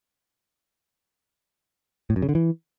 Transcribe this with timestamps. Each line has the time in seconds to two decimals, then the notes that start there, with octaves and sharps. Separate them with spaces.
2.10 A2
2.16 F#2
2.22 C#3
2.29 D3
2.35 E3